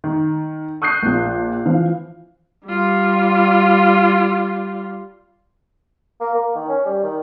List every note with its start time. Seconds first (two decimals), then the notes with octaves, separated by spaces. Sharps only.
0.04 D#3
0.82 C#6 D#6 F#6 G6 C7
1.03 A#1 A#2
1.66 E3 F3 F5
2.67 G3 F4
6.21 A#3
6.35 A#3
6.55 D#3
6.69 C#4
6.86 G3
7.03 D#3